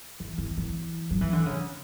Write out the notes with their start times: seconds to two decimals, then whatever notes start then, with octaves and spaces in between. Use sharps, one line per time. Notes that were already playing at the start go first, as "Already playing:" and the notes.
0.20 E3
0.38 E3
0.57 E3
1.11 F#3
1.21 E3
1.33 D3
1.46 C#3